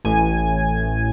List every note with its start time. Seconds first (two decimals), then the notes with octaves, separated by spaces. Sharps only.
0.05 A1 A2 G#5